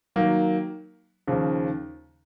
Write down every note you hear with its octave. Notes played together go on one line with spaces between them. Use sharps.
D#3 F#3 A#3
D#2 C#3 F3